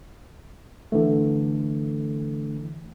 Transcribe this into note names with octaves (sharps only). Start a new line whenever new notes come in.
D3 E3 A3